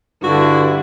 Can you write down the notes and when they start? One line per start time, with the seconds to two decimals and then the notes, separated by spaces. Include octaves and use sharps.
0.24 G2 D3 D4 E4 F#4